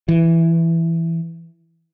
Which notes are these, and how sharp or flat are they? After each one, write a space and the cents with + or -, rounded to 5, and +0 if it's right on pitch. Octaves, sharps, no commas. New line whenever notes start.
E3 +5